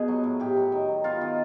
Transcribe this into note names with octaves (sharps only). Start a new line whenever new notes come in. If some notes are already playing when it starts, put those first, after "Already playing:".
Already playing: B2 B3 G#4
F#3
A2
A2 G4
F#3
D#3
D#3
B3 F4
D#3